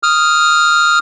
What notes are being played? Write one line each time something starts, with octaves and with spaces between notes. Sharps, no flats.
D#6 F6